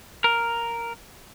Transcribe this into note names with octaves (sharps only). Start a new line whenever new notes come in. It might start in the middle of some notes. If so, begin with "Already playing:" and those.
A#4